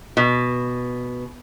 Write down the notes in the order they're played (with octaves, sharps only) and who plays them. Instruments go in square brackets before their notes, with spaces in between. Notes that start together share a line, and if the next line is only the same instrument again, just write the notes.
[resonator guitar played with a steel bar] B2